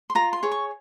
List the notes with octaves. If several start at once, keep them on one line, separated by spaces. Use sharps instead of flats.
C6
F4 A#5
C6
G#4 C#5
C#6